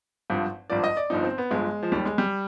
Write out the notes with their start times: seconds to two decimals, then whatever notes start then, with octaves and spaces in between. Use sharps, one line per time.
0.30 G#1 G2 F3
0.70 G#1 G2 F3 D5
0.84 D#5
0.97 D5
1.10 G1 G2 F3 D#4
1.24 C4
1.38 B3
1.50 G1 G2 F3 G#3
1.83 F3
1.92 D#2 D#3 G3
2.05 G#3
2.18 G3